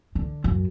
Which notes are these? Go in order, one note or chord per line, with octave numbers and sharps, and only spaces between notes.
D3
F#2